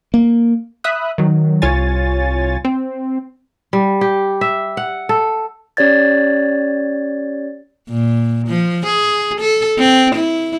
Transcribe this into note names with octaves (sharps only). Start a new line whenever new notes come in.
A#3
E5 B5 D#6 F#6
D#3 F#3
C2 F4 C#5 G#5 A6
C4
G3
G4
E5
F#5
A4
C#4 G4 C#5 D5 G#6 A6
A#2
F3
G#4
A4
C4
E4